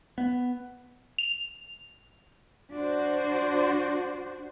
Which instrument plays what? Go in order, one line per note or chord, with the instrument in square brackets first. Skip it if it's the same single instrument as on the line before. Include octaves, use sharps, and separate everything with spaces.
[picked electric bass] B3
[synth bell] F7
[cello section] D4 F#4 C5